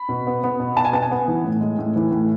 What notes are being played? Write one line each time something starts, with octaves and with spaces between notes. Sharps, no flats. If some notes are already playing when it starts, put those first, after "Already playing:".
Already playing: B5
B2
B3
B3
B2
B2 A5
G#5
B3 A5
G#5
B3
E3
A2
G#3
A2
E3
A2